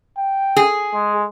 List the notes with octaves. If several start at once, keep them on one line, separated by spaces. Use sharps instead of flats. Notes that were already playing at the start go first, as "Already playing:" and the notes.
G5
G#4
G#3